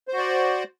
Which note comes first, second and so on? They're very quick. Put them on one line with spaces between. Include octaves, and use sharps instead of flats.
C5 F#4 D5